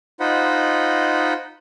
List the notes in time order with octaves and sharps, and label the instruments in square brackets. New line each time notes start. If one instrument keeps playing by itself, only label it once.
[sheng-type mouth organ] D#4 F4 C5 D#5 F#5 B5